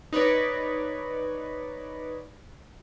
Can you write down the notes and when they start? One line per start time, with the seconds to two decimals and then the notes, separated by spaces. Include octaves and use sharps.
0.13 D#4 B4 C#5 D5